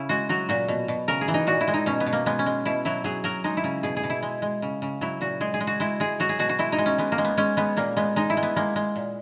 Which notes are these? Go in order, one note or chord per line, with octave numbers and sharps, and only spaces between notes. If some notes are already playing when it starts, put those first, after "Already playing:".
Already playing: C#3 E4
G#3 F#4
F#3 F#4
A#2 F#4
B2
B2
C#3 A#4
G#4
E3
D#4
A#2 F#4
E4
G#3
D#4
B2 C#4
B3
B2
A#3
G#3 B3
C#4
G#3
B2 E4
F#3 E4
F#3 G#4
F#3 A#4
G#3 D#4
E4
C#3
B2 G#4
G#4
B2
E4
G#3
G#3
C#3
C#3
F#3 E4
A#2 F#4
G#3 G#4
G#4
G#3
F#4
G#3 E4
G#3 G#4
F#3 F#4
G#4
B2 F#4
F#4
G#3 E4
D#4
G#3
C#4
G#3 B3
A#3
G#3
B3
G#3 C#4
G#3 B3
A#2 A#3
G#3 B3
G#3 D#4
E4
G#3
B3
G#3 A#3
G#3
A#2